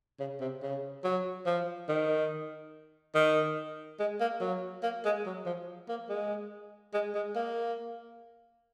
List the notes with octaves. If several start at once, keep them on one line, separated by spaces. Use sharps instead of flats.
C#3
C3
C#3
F#3
F3
D#3
D#3
G#3
A#3
F#3
A#3
G#3
F#3
F3
A#3
G#3
G#3
G#3
A#3